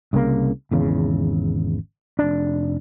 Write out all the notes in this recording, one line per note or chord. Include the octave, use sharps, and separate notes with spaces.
C2 C#3 F#3 A#3
G#1 E2 C#3
F1 D4